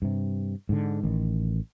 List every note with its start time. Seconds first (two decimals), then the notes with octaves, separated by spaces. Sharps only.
0.02 G2 C3
0.69 G#2 D3
1.03 A1 D#3